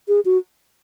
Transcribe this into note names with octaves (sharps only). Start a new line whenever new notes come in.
G#4
F#4